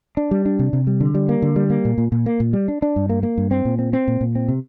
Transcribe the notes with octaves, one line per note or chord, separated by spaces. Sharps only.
D4
G3
D4
C3
C3
G3
D3
G3
A#3
D3
G3
A#3
A#2
A#2
A#2
A#3
A#2
G3
D4
D4
G2
A#3
A#3
G2
C4
A#2
C4
C4
A#2
A#2
C4
C3